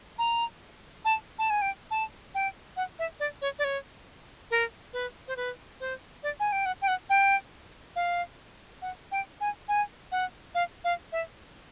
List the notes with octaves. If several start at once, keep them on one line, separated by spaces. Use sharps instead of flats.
A#5
A5
A5
G#5
G5
A5
G5
F#5
E5
D5
C#5
D5
C#5
A#4
B4
C5
B4
C5
D5
G#5
G5
F#5
G5
F#5
G5
F5
F#5
G5
G#5
G#5
F#5
F5
F5
E5